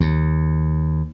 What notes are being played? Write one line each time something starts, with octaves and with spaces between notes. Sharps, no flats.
D#2